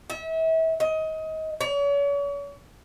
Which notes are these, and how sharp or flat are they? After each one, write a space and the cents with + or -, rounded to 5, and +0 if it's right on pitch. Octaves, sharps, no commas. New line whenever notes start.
E5 -35
D#5 +25
C#5 +40